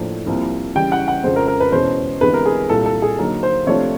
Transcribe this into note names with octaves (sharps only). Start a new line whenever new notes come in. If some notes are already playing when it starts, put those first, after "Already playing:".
Already playing: A2 F3 A#3 D4
C2 C3 F3 A#3
C#3 E3 G3 G5
F#5
F#5
F2 C#3 F3 G#3 C5
A#4
A#4
B4
E2 B2 G#3 C#4 C5
D2 C3 E3 G#3 B3 B4
A#4
G#4
C2 A#2 G3 A4
A4
G#4
D3 F#3 A#3 D#4
C5
C3 F3 A3 D4 F4 C#5